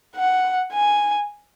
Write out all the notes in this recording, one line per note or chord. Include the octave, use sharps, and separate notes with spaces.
F#5
G#5